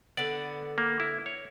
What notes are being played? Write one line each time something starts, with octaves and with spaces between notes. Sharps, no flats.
D3 B3 D5
A#3
E4
C#5